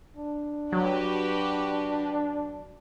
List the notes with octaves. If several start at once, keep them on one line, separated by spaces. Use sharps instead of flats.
D4
F#3 F#4 G4 B4